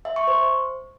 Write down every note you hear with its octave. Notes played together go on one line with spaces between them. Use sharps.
E5
C#6
C5